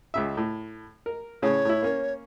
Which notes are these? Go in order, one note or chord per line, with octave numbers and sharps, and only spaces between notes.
C#2 C#3 E5
A2
A#4
A2 C#3 C#5
A2 E4
A#3 C#4